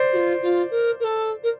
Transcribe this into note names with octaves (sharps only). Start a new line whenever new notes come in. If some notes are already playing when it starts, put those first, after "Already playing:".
Already playing: C5 D5
F#4
F4
F4
A#4
A#4
A4
A#4